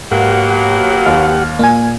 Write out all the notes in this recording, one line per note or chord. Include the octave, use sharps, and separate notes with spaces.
G#2 B2 F#3 A#3 G4 F#5
D#2 F6
A#2 A#3 G#5